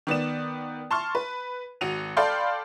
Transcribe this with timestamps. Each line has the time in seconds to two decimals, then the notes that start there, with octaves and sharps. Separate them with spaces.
0.07 D#3 B3 D5 E7
0.91 A5 C6 C#6 F6
1.15 B4
1.81 G#1 F#4 D#7 F7
2.17 A4 D5 F5 G5 B5 C6